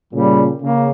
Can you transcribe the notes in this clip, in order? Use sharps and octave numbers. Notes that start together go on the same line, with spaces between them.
A#2 C#3 G3
C#3 A#3